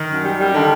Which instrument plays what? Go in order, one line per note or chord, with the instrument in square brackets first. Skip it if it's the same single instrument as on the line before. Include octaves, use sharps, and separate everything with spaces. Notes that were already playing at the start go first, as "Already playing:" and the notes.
Already playing: [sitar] D#3
[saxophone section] F#2
G3
G3
[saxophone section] D3 [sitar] D#3